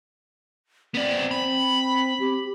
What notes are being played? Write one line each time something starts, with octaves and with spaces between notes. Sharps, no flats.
B3 C4 D5
B5
G4